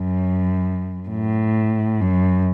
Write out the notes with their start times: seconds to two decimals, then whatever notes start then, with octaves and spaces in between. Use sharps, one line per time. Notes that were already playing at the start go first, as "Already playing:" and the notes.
Already playing: F#2
1.09 A2
2.01 F#2